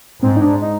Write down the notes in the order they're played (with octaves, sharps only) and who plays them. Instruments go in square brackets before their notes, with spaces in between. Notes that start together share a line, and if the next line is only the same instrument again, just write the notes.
[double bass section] G#2 [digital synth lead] C4
[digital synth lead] D#4
D4
D#4